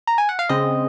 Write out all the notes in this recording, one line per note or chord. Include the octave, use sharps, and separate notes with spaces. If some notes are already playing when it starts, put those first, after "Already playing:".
A#5
G#5
F#5
F5
C#3 G#3 C4 D#5